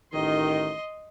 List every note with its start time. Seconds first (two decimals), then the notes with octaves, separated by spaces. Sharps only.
0.13 A1 D#3 D#5 C6